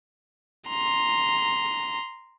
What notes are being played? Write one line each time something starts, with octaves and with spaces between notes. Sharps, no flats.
A#5 C6